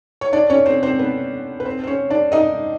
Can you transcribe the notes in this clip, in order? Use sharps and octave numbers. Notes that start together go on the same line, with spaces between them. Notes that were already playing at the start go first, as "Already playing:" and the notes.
C#5
D4 D5
C#4 C#5
C4 C5
C4 C5
B3 B4
B4
C4 C5
C5
C#4 C#5
D4 D5
D#4 D#5